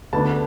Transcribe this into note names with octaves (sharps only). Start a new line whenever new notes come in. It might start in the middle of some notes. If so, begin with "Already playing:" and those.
D2 D3 B3 D4 A5